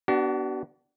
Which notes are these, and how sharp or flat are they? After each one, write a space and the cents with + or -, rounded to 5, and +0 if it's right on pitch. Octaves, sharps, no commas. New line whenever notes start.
B3 +0 D4 +0 F#4 +45